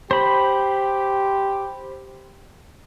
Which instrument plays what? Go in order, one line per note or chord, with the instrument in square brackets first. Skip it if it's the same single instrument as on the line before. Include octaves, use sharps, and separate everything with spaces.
[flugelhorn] G4 [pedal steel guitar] C5 B5